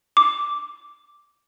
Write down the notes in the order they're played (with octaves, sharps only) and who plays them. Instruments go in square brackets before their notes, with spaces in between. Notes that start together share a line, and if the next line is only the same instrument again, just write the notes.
[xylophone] D6